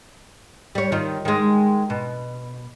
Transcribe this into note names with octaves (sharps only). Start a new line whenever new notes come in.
G3 C#5
D#3 F4
D#3 G#3
B2